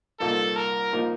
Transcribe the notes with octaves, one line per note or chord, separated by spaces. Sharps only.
C2 A#2 F3 A#3 D#4 A4
A#4
A#2 F3 A#3 D#4